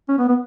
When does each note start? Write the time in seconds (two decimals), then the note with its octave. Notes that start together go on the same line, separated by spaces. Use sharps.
0.08 C#4
0.19 B3
0.29 B3